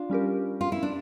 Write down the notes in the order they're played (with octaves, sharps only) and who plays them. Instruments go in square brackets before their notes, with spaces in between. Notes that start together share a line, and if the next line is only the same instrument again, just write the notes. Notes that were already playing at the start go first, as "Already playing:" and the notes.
Already playing: [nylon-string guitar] D4 F4
[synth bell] G3 C#4 G4 A#4
[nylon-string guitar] F4
E4
D4